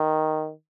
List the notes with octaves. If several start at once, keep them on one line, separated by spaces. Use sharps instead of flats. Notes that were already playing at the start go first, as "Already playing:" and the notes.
Already playing: D#3